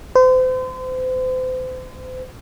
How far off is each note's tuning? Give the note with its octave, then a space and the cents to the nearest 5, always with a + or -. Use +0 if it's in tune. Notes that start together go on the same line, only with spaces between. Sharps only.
C5 -35